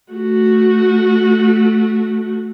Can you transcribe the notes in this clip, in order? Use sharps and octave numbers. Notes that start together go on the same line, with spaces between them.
A3 F#4